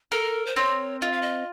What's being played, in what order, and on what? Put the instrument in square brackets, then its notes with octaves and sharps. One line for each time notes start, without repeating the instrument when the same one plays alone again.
[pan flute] A4 [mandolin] A#4
[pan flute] C5
[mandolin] C4 [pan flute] C#5
[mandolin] F4 [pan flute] D#5
[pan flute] F5
D#5